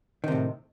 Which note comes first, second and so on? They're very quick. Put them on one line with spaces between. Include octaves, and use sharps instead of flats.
D#3 C3 A2